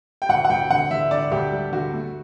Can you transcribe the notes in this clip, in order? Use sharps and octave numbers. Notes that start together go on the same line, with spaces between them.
G5
D2 F#5
F#5
D2 G5
D3 F#5
D3 E5
D3 D5
D2 G4
G3
D3 F#4
A3